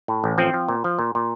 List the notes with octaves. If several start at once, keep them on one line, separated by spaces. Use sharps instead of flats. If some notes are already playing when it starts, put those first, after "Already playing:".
A2
A1
F3 C4
F3
A#2
F3
A#2
A#2